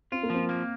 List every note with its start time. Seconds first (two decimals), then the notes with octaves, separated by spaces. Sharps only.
0.12 C4 F4
0.23 A#3
0.30 F3 C4
0.49 A#3